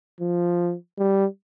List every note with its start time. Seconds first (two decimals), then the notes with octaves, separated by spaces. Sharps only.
0.21 F3
0.99 G3